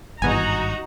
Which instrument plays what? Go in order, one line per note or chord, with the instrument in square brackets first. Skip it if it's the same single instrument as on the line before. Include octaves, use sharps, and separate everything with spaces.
[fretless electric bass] G#1 G2 [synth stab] E2 B2 G#5 [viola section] D#4 F#4 A#5